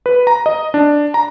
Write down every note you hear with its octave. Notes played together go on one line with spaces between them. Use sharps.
B4
A#5
D#5
D4
A#5